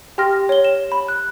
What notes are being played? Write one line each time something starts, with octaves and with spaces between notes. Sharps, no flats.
G4 G5 C6 F6 A#6
C#5 G7
E7
B5
F#6